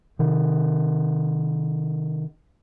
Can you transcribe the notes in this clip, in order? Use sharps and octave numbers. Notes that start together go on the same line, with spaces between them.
C3 D#3